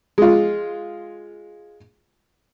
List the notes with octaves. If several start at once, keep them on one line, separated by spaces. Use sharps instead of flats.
G#3 F4